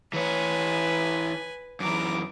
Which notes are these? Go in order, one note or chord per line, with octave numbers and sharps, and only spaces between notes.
E3 B4 C#5 G#5
F#2 E3 A#5 D6